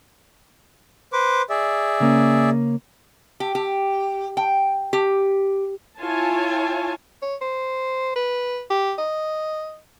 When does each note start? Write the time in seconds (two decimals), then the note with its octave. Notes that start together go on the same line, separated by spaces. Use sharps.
1.13 B4 C5 D6
1.50 G#4 D5 E5
2.00 C#3 A#3 C#4
3.40 G4
3.55 G4
4.37 G5
4.93 G4
5.99 E4 F4 C#5 G#5 A5
7.22 C#5
7.41 C5
8.16 B4
8.70 G4
8.98 D#5